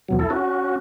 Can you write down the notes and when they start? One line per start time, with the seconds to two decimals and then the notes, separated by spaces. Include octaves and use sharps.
0.09 E2 B2 F#3
0.19 E4 A4
0.30 C#4 F#4